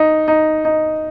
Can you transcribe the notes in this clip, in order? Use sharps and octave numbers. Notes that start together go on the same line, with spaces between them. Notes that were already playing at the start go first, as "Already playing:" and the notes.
Already playing: D#4
D#4
D#4